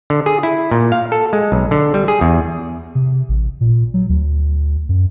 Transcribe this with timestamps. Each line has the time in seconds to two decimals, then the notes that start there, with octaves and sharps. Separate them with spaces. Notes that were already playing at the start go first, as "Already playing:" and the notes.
0.10 D3
0.26 G#4
0.43 E4
0.71 A#2
0.92 F5
1.12 A4
1.33 G#3
1.52 B1
1.71 D3
1.94 G3
2.08 G#4
2.21 E2
2.95 C3
3.29 A1
3.61 A#2
3.94 F#3
4.09 D2
4.89 F#2